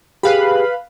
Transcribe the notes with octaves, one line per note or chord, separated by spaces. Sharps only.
G4 G#4 B4 F5 B5